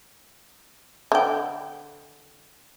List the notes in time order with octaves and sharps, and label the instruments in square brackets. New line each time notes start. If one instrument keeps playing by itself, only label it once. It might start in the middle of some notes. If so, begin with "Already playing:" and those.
[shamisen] D3 G5